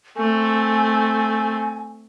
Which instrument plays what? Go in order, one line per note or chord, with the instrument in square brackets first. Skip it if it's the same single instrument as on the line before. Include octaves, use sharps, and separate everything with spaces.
[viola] A3 C4 [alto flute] G#5